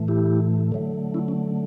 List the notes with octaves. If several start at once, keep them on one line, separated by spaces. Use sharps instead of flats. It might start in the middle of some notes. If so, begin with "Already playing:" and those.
Already playing: A2 E3 A3
E4 G4
D3 F#3 A3
C#4 E4
C#4